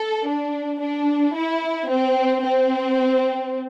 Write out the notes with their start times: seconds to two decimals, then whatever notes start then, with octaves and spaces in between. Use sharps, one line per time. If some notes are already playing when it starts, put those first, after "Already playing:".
Already playing: A4
0.27 D4
0.81 D4
1.36 E4
1.90 C4
2.44 C4